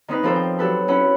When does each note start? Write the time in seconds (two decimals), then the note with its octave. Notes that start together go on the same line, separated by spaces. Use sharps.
0.08 D#3 C4 D#4 B4
0.23 F3 C4 A4 A#4 C5
0.35 G5
0.59 F#3 G4 A4 B4
0.88 C#4 E4 F#5 B5